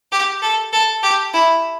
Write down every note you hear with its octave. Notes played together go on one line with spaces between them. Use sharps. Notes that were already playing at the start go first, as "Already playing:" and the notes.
G4
A4
A4
G4
E4